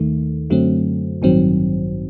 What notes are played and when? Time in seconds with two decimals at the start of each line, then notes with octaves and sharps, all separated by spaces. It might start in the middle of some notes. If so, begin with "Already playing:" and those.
Already playing: D#2 D#3 A3
0.50 F#2 D3 F#3 A3 C4
1.22 A1 G2 D#3 F#3 C4